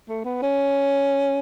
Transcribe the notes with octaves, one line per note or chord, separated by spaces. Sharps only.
A3
B3
C#4